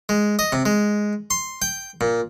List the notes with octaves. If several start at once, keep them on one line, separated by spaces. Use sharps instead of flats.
G#3
D#5
C3
G#3
C6
G5
A#2